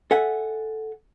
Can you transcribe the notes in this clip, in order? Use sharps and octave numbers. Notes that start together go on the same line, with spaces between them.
A4 E5 F#5 G#5